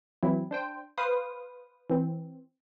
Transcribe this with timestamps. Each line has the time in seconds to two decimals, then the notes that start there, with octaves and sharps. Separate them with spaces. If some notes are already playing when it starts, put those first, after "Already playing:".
0.23 E3 F#3 C4 E4
0.51 D4 C5 G5
0.98 B4 C5 F5 D#6
1.90 E3 C4